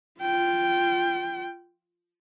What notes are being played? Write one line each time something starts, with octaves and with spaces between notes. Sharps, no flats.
F4 G5